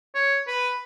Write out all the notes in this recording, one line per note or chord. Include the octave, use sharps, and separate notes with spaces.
C#5
B4